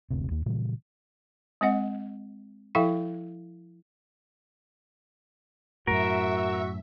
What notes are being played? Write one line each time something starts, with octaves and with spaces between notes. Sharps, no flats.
F#1 D2 C3
D#2 A#3
A#2 C#3 E3 G3
G#3 C4 D#5 F#5
F3 E4 A4 E5 F5 G5
F#2 A2 F#4 A#4 E5